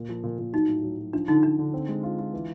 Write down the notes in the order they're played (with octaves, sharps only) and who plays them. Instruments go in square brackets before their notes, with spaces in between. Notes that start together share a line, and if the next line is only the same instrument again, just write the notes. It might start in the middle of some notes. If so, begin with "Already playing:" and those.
Already playing: [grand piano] A#2
F3
A#2
A#2
[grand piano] F#3 [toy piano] D#4
[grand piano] A2
F#3
F#3
[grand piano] F3 [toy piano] D4
[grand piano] D3 [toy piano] D#4
[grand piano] D3 [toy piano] D4
[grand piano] D3
C4
G#3
F4
F4
E3